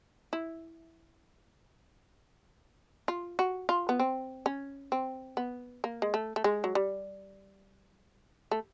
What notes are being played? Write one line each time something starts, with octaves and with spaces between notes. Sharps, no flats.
E4
F4
F#4
F4
B3
C4
C#4
C4
B3
A#3
G#3
A3
A3
G#3
F#3
G3
A3